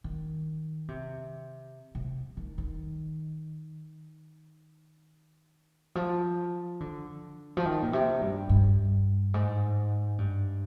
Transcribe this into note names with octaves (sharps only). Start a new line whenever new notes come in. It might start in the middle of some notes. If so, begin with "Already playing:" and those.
D#3
C3
C3
D#3
D#3
F3
D3
F3
D#3
A#2
C3
G2
G2
G#2
G2